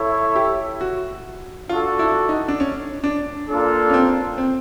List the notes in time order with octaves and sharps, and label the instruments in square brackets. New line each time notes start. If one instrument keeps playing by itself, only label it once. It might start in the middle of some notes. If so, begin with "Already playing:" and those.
Already playing: [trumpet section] E4 A4 C#5 E5
[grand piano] G4
F#4
[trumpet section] D4 F#4 A4 [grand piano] F4
[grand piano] E4
D#4
D4
C#4
D4
[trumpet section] A#3 D4 F4 A4
[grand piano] C#4
C4
C4